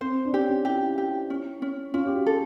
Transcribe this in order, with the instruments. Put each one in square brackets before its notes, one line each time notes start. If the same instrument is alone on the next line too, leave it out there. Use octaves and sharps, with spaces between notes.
[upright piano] C4 [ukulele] C5
[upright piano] D4
[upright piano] C#4 [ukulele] G4
[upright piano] C#4
[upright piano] E4 [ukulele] G4
[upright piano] F4
E4
[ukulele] G4
C#4
C#4
[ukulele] C#4 [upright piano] F4
[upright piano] G4
F#4
[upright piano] G#4 [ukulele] A4